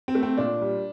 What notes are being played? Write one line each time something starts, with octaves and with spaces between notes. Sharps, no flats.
C4
A3
C4
A#2 D4
G3